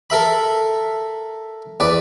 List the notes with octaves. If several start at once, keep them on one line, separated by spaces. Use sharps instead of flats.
A4 A#4 E5 B5
E2 B4 D5